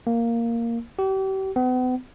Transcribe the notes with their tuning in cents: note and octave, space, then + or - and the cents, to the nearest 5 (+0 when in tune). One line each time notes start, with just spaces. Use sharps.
A#3 -5
G4 -35
B3 +40